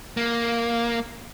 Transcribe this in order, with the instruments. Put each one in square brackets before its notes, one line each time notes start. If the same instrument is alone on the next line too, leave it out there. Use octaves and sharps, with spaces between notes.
[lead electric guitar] A#3